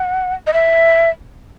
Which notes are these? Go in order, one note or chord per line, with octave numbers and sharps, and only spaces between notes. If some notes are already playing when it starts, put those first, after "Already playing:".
Already playing: F#5
D#5
E5